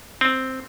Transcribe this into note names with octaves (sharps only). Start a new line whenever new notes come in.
C4